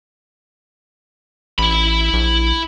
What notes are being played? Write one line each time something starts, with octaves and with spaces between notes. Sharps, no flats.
A1 E4 B5
A#1